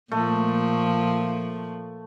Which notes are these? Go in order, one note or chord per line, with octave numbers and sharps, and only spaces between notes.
A#2 F3 A3